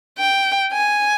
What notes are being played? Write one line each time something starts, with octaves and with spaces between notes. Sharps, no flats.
G5
G#5